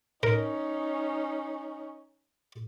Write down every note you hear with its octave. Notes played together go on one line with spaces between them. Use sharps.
C#4 D#4 A#4